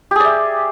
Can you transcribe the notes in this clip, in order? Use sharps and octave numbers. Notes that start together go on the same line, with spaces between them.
G4 G#4 D5 E5